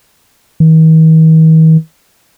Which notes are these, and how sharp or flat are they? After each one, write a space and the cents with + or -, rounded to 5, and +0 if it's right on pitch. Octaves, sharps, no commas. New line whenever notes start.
D#3 +45